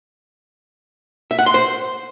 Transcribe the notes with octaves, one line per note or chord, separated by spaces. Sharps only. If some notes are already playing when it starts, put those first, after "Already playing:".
E5
F#5
C6
C5